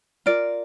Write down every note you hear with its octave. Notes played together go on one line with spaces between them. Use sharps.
F4 A#4 D5